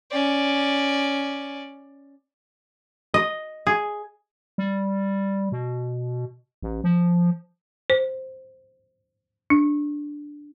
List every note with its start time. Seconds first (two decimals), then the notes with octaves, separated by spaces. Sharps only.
0.11 C#4 D5
3.14 D#5
3.67 G#4
4.58 G3
5.52 B2
6.62 A1
6.84 F3
7.90 C5
9.50 D4